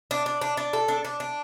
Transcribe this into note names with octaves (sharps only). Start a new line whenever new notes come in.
D4
D4
D4
D4
A4
D4
D4
D4